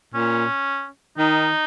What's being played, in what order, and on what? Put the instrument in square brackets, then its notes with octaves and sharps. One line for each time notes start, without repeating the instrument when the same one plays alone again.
[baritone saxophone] A#2 [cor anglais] C#4
[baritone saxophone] D#3 [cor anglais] D#4